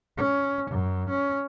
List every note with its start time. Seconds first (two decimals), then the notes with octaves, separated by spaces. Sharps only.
0.17 C#4
0.71 F#2
1.09 C#4